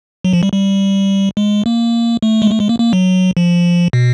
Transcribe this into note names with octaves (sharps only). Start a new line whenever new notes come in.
F#3
F3
G3
G3
G#3
A#3
A3
G#3
A3
G#3
A#3
A#3
F#3
F3
B2